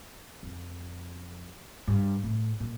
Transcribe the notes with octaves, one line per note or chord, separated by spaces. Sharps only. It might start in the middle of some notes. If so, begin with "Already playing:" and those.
F2
G2
A2
A#2